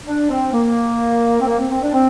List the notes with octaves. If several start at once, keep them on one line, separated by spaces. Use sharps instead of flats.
D4
C4
A#3
C4
A#3
C4
C4
D4
C4